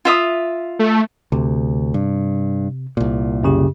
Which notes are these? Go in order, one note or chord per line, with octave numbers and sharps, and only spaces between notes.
F4 E5 D#6
A3
D2 C3
G2
C2 A#2
F#2 C#3 G4